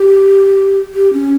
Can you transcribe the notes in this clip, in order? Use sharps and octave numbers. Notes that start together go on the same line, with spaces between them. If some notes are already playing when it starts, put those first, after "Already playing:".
Already playing: G4
G4
C#4